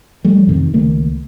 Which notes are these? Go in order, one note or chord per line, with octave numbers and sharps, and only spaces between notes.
F3 G3 A3
F2 C3 D#3
C#2 D#3 A3 A#3